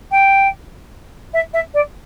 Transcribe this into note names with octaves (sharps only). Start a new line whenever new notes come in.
G5
E5
E5
D5